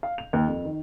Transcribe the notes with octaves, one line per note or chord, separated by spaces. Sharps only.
F5
F7
D#2
F2
D#3